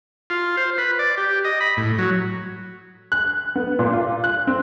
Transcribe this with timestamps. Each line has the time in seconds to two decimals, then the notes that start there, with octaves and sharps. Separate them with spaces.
0.30 F4
0.57 C5
0.78 B4
0.99 D5
1.17 G4
1.45 D#5
1.61 B5
1.77 A2
1.99 F#3
3.12 F#6
3.56 B3
3.79 A#2
3.93 F4
4.24 F#6
4.47 C4